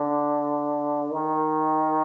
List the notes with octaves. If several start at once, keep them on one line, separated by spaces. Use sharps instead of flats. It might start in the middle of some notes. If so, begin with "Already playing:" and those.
Already playing: D3
D#3